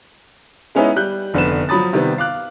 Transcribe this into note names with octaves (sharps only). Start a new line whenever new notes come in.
G#3 B3 C#4 D#4 E4
G3 F#6 G6
F1 D3 B3 B4 E7
F3 F#3 B5 D#6 A6
C3 D#3 G3 B3
F5 D6 F#6